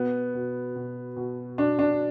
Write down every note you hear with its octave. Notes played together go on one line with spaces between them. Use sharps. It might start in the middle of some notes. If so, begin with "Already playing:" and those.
Already playing: B2 B3
B2
B2
B2
B2 D4
D4